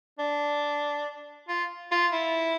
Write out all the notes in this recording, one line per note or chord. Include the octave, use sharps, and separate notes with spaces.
D4
F4
F4
E4